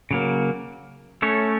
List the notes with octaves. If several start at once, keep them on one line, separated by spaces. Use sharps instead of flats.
C#3 F#3 A#3
A3 C#4 A4 C#5